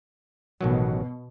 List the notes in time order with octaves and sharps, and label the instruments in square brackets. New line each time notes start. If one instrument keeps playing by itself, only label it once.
[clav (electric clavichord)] A1 D#3 F#3 [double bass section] B2